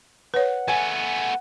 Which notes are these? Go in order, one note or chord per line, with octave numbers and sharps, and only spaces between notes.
B4 C#5 F#5
A3 B3 G#5